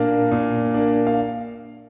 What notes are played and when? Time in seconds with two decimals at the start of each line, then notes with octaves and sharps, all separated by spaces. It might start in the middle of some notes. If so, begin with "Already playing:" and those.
Already playing: A#2 A#3 D4 F5
0.31 A#2
0.74 A#3 D4
1.07 F5